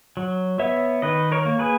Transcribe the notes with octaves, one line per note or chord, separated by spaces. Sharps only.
F#3
B3 C#5 E5
D#3 B4 D#5
A#4 C#5
A#3
G#4 B4